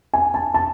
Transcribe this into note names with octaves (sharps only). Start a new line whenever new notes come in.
G#5
A5
A5